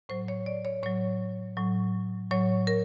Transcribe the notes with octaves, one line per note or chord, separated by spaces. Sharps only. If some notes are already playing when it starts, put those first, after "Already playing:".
A2 F#3 C5
C#5
D5
C#5
A2 F#3 C#5
A2 F#3
A2 F#3 C#5
A#4